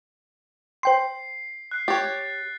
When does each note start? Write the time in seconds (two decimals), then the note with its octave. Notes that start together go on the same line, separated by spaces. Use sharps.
0.83 C5 G5 C6 C7
1.71 F#6 C7
1.88 G4 C#5 A6